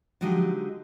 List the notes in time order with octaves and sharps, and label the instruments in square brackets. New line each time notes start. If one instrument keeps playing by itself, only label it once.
[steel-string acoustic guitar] D3 F3 F#3 G#3 D#4 G4